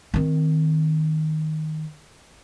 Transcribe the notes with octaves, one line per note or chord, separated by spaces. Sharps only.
D#3 C4